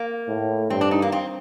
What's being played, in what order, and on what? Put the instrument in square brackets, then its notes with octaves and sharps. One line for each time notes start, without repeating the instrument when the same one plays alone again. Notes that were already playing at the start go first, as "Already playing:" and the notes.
Already playing: [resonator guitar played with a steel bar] A#3
[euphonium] A2
[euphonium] G2 [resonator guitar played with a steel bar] C4
[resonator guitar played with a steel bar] D4
D#4
A#3
C4